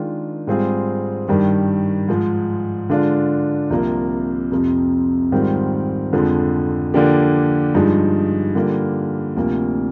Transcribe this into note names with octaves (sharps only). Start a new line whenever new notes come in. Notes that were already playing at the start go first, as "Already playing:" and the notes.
Already playing: D#3 G#3 D4 F4
G#2 G3 C4 F4 G#4
G2 D#3 G3
G#2 F3 G#3
D3 G#3 D4 F4
C2 C3 F3 A#3
F2 C3 F3
G#2 D#3 G3 C4 F4
F2 D3 F3 G#3
D3 F3 A#3 D4 G4
G2 F3 G#3 D#4 G#4
D3 G3 A#3 F4
D2 C3 F3 A#3